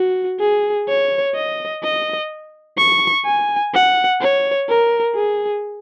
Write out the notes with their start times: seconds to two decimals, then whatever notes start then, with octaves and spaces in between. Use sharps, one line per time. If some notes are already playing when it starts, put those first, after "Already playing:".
Already playing: F#4
0.40 G#4
0.88 C#5
1.35 D#5
1.83 D#5
2.78 C#6
3.25 G#5
3.74 F#5
4.21 C#5
4.69 A#4
5.15 G#4